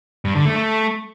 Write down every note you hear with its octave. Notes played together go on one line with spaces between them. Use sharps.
G2
D3
A3
A3